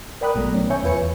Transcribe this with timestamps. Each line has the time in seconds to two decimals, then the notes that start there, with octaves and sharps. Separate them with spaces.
0.21 A#4 D5 G5 B5 D#6 F#6
0.34 A#1 B2 F#3 A3 A#5
0.54 B2 D#3 C#4
0.70 C#5 E5 G#5 C#6 G6
0.83 E2 F4 B4 G#5 C#7
0.97 E3